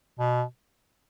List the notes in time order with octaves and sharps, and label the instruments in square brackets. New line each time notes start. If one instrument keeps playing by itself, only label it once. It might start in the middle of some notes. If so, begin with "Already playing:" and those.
[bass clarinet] B2